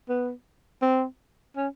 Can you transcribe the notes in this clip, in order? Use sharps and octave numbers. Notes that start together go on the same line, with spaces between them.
B3
C4
C#4